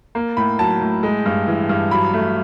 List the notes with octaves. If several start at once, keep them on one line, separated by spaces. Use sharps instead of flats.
A#3
A2 B5
F#3 A5
A2
G#3
G2
E3
G2
F#3 B5
A3